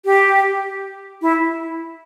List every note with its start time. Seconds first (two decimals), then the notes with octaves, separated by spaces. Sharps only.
0.05 G4
1.22 E4